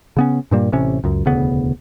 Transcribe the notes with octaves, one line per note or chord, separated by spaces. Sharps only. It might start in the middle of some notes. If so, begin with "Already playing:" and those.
C#3 B3 C#4
G2 A#2 G3 A#3
A1 C3 C#4
C#2 F#2
E1 D2 C#3 B3